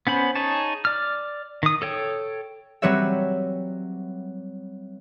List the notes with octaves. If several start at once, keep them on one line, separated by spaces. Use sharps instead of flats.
B3 C#4 C5 B5
D#4 G#4 C#5 A5
D5 F6
D#3 D#6
A4 C#5 G5
F#3 G3 C4 B4 C#5 E5